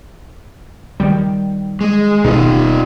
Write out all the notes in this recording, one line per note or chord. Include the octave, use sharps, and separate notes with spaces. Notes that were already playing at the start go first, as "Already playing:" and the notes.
D#3 G3
G#3
D#1 B2 D#4 F4